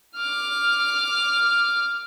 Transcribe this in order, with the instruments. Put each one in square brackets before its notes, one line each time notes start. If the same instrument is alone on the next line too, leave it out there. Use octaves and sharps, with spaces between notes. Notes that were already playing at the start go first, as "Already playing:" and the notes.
[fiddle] D6 F6